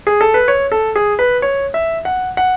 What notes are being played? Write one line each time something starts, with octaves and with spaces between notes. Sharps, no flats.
G#4
A4
B4
C#5
A4
G#4
B4
C#5
E5
F#5
F#5